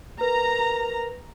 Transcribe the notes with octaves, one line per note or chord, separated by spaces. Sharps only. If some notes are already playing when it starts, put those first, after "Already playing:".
A#4 B4 A#5